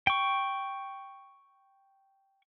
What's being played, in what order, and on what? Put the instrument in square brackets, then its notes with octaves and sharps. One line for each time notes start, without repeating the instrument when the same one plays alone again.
[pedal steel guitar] G5 C#6